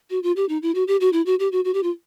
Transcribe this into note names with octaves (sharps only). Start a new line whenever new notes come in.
F#4
F4
G4
D#4
E4
F#4
G4
F#4
E4
F#4
G4
F#4
F#4
G4
F4